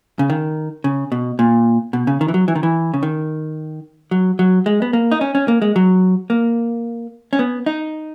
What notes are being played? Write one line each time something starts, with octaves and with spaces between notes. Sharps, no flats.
C#3
D#3
C#3
B2
A#2
B2
C#3
D#3
E3
F#3
E3
D#3
E3
C#3
D#3
F#3
F#3
G#3
B3
A#3
D#4
C#4
C#4
A#3
G#3
F#3
A#3
C#4
B3
D#4